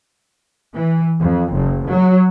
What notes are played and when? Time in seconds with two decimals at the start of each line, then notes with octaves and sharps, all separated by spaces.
0.75 E3
1.20 F2
1.52 F#1
1.89 F#3